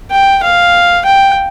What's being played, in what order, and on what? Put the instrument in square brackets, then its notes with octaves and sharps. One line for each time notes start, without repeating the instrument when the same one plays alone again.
[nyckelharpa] G5
F5
G5